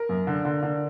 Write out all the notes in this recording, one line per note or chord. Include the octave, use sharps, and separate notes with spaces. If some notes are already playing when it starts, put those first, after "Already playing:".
Already playing: A#4
F#2
D3
D3
D3